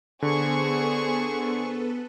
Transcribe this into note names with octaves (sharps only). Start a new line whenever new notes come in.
D3 B3 G#4 A4 B4 C5 C#6